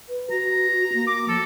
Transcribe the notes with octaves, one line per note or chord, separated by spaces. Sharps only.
B4
F#4 A#5
F#4
A#3
D6
F3 A4